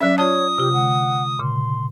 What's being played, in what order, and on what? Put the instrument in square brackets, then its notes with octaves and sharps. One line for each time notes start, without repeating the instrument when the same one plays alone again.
[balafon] F#3 C#4 [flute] D5 [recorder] E5
[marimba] F4 D5 [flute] C#5 [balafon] A5 [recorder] D#6
[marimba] C3 F4 [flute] G4
[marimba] D3 G#3 [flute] F#5
[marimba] A#2 C#3 [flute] C6